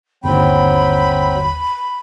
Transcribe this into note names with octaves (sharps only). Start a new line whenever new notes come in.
G1 D#2 F#3 C4 G5 B5